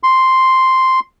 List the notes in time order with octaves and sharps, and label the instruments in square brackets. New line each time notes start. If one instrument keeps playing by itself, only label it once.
[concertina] C6